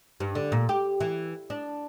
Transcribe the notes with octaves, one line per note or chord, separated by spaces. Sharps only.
G2
D3
A#2
G4
E3
D4